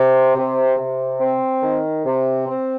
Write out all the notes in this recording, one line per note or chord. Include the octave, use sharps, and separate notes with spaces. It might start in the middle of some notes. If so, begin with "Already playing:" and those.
Already playing: C3
C3
C3
C4
D#3
C3
C4